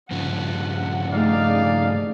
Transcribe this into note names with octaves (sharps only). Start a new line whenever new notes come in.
G2 C#3 F3 F#5
D#2 A3 D#4 G#4 D5 F5